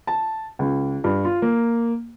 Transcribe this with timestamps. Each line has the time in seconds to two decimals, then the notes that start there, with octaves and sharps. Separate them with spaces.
0.07 A5
0.59 C#2
1.04 G2
1.25 F4
1.42 A#3